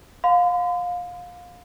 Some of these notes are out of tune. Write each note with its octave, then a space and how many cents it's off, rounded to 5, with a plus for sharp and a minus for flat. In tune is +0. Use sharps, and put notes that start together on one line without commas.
F5 +25 C6 -45